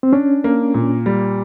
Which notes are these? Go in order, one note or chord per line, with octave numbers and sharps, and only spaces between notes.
C4
C#4 D4
A#3
A#2
G3